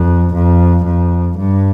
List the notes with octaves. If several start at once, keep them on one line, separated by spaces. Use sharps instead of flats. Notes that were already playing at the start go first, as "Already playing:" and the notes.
Already playing: F2
F2
F2
G2